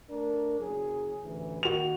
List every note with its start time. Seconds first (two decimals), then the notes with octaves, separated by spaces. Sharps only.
0.10 A3 D4 A#4
0.60 F#1 F#3 G#4
1.23 A1 D2 E3
1.63 D#3 A#3 F#4 F7